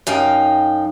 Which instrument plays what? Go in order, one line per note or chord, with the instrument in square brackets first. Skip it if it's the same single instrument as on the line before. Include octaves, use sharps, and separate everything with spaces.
[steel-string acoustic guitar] F#2 D#4 F5 G5